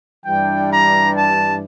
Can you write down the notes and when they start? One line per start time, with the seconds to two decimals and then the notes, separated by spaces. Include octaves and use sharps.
0.25 G2 E3 G3 D4 G5
0.69 A#5
1.13 A5